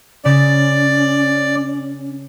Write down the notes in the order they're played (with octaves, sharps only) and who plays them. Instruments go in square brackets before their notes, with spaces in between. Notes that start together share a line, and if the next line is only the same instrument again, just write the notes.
[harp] C#3 A6 [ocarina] C#4 [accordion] D5